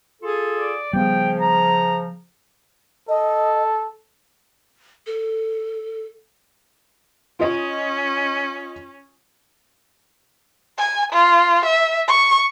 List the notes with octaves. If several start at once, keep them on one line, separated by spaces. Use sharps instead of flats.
F4 G#4 A4
D5
C#3 F3 G3 B3 G5
A#5
A4 D#5
A4
C#4 F4 D#5
G#5
F4
E5
C#6